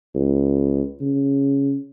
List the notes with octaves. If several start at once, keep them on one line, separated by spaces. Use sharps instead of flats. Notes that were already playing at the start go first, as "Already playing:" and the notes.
C#2
C#3